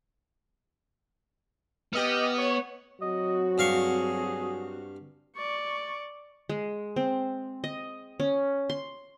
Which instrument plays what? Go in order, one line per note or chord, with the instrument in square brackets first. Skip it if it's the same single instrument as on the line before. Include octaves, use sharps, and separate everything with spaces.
[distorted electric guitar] B3 [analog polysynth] G4 D#5 F6
[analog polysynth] C#5
[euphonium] F#3 [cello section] C4 F#4 [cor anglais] D#5
[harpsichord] G2 F5 C#6 [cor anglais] G#4
[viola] D5 C#6
[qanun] G#3
C4
D#5
C#4
C6